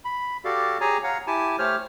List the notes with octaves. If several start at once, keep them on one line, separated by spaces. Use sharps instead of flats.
B5
F#4 G4 A4 D5 F5
G4 G#4 C#5 G#5 A#5
C#5 F5 F#5 A#5
E4 G4 G#5 A5
A3 G4 C5 C#5 F6